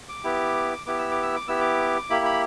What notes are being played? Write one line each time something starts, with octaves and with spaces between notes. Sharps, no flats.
D6
B3 E4 G4
B3 E4 G4 D6
E6
D6
E6
D6
B3 E4 G4 E6
D6
A#3 E4 G4 B5
B5